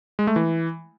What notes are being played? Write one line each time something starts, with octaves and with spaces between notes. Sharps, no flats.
G#3
A3
E3